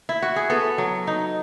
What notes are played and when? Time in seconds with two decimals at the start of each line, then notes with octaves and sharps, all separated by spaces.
0.09 E4
0.22 F#4
0.36 G#4
0.50 B3 A4
0.78 F#3
1.07 D#4